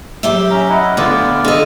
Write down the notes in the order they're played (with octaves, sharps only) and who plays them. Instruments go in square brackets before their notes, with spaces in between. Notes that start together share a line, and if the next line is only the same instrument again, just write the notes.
[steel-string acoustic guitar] F#2 G4 E5
[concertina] C#4 A#5
E4 D#5 F#5
[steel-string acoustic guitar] D2 D3 B3 [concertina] F4 D5
[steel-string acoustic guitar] D3 D#5